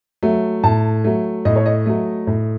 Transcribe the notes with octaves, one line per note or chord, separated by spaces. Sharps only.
F#3 A3
A2 A5
F#3 A3
A2 D#5
C#5
D#5
F#3 A3
A2